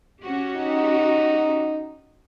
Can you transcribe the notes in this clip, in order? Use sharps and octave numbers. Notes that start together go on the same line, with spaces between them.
C#4 F#4 G4
D#4